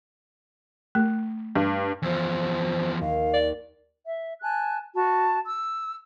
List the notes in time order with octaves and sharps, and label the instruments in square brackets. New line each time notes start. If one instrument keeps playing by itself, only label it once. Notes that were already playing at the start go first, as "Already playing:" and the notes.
[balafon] A3
[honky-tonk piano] G2
[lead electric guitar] E2 F3 [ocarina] C5
[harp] D#2 [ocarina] F5
[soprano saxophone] D5
[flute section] E5
G#5 A5 F#6
F#4 A5
E6